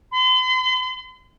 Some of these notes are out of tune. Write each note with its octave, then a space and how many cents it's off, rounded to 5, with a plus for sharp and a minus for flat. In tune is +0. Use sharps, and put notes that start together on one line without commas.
C6 -45